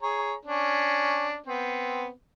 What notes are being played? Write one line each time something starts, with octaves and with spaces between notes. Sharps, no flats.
G#4 C#5 A#5
C#4 D4
B3 C4